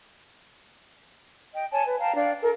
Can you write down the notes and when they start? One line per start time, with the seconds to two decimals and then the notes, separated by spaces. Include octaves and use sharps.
1.54 D#5 G5
1.72 C#5 G#5 A5
1.86 B4
1.99 F5 G5 A5 A#5
2.15 D4 F5 G5
2.42 A4 A#4